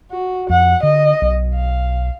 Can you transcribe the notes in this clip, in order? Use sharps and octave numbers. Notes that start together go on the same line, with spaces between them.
F#4
F2 F#5
D3 D#5
B1
F5